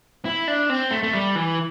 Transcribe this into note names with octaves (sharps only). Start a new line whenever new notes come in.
E4
D4
C4
A3
A3
G3
E3